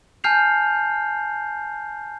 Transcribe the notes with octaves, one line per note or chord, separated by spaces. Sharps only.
G#5 A5 F6 G6 C7 F7